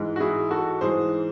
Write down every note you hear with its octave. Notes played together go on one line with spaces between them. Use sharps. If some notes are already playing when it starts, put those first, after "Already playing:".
Already playing: G#2 E3 G#3
F#4
E4 G#4
F#4 A4
G#2 E3 G#3 G#4 C5